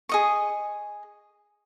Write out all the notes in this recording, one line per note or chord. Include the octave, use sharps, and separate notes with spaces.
G#4 D#5 C#6